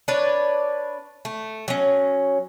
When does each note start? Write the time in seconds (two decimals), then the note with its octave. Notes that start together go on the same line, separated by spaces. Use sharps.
0.08 D4 B4 C#5 D5
1.25 A3
1.68 F#3 C#4